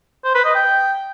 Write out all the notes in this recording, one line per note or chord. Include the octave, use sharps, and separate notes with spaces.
C5
B4
D#5
G5